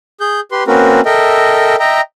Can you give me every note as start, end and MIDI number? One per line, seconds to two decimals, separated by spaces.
0.21 0.40 68
0.21 0.40 91
0.52 0.64 67
0.52 0.64 71
0.52 0.64 84
0.67 1.01 58
0.67 1.01 60
0.67 1.01 61
0.67 1.01 66
0.67 1.01 70
0.67 1.01 71
1.06 1.76 69
1.06 1.76 70
1.06 1.76 75
1.06 1.76 76
1.06 1.76 79
1.79 2.01 75
1.79 2.01 76
1.79 2.01 79
1.79 2.01 82